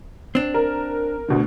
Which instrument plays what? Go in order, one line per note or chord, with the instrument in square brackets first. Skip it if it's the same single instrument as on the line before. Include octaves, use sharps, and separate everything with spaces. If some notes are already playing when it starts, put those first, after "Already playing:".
[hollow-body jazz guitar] C4 D4
[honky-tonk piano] A#4
D2 B2 D3